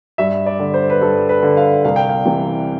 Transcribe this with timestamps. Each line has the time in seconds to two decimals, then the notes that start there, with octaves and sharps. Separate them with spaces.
0.18 G2 E5
0.46 D5
0.59 D3
0.74 C5
0.90 B4
1.01 G2 A4
1.29 B4
1.43 D3
1.57 F5
1.85 C2 F5
1.96 G5
2.09 F5
2.25 C3 E3